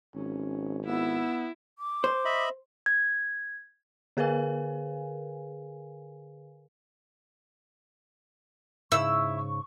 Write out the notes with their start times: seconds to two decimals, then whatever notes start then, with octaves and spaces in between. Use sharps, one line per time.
0.14 G#1 C#4
0.86 B3 E4 E6
1.79 D6
2.04 C5
2.25 D#5 E5 B5
2.86 G#6
4.17 D3 G#4 A#4 B4 F5 G#5
8.92 G#2 C#3 E4 C#6 E6